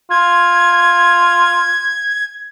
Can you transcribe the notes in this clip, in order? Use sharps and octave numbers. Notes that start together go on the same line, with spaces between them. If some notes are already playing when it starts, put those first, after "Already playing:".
F4 G#6